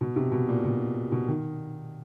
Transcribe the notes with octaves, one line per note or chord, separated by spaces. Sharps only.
B2
C3
B2
A#2
B2
B2
D#3